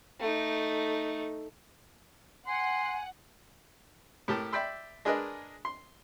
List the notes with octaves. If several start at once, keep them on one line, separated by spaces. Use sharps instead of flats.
A3 D#4
F#5 G#5 C6
A2 G4 A#4 A5
D5 E5 G5 B5 C6 E6
G#3 D4 G#4 A#4 B4 D#5
C6